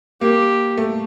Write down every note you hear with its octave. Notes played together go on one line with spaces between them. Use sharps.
A#3 G4
A3